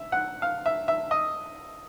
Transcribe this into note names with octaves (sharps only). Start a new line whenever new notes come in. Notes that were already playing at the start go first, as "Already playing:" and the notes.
Already playing: E5
F#5
F5
E5
E5
D#5